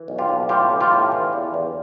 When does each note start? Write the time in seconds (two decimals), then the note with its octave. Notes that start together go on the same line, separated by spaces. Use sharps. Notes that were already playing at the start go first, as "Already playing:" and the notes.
Already playing: E3
0.08 B1
0.18 F4 G4
0.29 B1
0.49 A2 F4 G4
0.70 E3
0.81 F4 G4
0.91 A2
1.12 E3
1.33 E2
1.54 E2